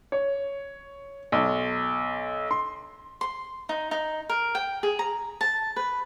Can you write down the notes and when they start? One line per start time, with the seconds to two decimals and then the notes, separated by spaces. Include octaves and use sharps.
0.12 C#5
1.32 B1
2.51 C6
3.21 C6
3.69 D#4
3.91 D#4
4.29 A#4
4.55 G5
4.83 G#4
4.99 A#5
5.41 A5
5.76 B4